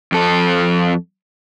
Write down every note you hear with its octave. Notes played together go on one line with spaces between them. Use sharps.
F2 A4